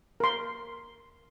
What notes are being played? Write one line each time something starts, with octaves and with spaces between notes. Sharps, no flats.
A#4 C6